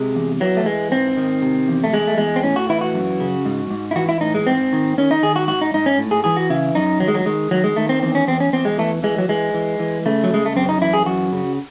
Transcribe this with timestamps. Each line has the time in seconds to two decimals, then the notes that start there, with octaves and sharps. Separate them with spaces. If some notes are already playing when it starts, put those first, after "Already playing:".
Already playing: C3 G#3
0.15 E2
0.40 E3 F#3
0.57 A3
0.66 E3 G#3
0.91 G#2 C4
1.17 D#3
1.42 C3
1.68 E2
1.84 A3
1.93 E2 G#3
2.07 A3
2.18 E2 G#3
2.36 C4
2.43 A2 C#4
2.56 F#4
2.69 E3 E4
2.81 F#4
2.94 F#2
3.20 C#3
3.46 G#2
3.71 G#2
3.91 E4
3.96 E3 F#4
4.09 E4
4.21 A2 D#4
4.35 G#3
4.46 G#2 C4
4.73 D#3
4.98 D#3 C#4
5.11 D#4
5.23 D#3 G#4
5.36 F#4
5.48 G#2 F#4
5.61 D#4
5.74 G#2 D#4
5.86 C#4
5.98 A2
6.11 G#4
6.24 E3 G#4
6.37 F#4
6.50 C#3 E4
6.75 F#2 D#4
7.00 D#3 F#3
7.08 G#3
7.15 F#3
7.25 D#3 G#3
7.51 D#3 F#3
7.64 G#3
7.76 D#3 A3
7.89 C4
8.02 E2 C4
8.15 C#4
8.27 E2 C4
8.40 C#4
8.53 E2 C4
8.65 G#3
8.78 E3 A3
9.03 E3 G#3
9.18 F#3
9.29 E3 G#3
9.54 E3
9.80 E3
10.06 C#3 A3
10.24 F#3
10.30 C#3 G#3
10.46 A3
10.55 F#2 C4
10.69 D#4
10.81 E3 E4
10.94 G#4
11.06 F#2 F#4
11.33 C#3